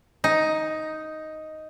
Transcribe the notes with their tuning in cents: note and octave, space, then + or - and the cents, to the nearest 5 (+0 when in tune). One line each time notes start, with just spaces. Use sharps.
D#4 +5